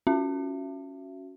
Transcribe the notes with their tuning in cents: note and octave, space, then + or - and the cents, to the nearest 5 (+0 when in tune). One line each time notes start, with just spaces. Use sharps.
C#4 +0 F#4 +0 E5 +30